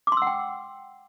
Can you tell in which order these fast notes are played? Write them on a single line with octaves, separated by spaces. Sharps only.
D6 C6 E6 F#5 G5